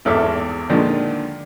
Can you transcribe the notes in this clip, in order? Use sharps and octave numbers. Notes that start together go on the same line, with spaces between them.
G#1 E2 A4 E5 D6 F6
A#2 D3 D#3 F3 G#3 D4